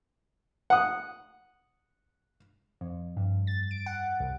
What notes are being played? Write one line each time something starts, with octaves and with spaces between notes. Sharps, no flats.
F#5 D#6
F2
G2
A6
D7
F#5
C2